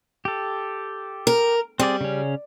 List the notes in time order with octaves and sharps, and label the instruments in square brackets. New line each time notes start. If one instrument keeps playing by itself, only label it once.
[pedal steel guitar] G4 A4
[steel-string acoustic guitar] A#4
[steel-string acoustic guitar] G3 [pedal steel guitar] C4 G#4 D5
[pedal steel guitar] C#3 C#4